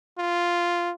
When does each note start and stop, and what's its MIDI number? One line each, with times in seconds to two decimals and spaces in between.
0.18 0.91 65